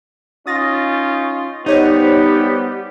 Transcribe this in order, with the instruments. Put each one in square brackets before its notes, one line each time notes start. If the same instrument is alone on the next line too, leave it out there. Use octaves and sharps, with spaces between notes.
[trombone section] C#4 D#4 F4 [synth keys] D#6 A6 A#6
[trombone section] G3 B3 [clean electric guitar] D#4 [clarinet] G4 [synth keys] C5 C#5 D#5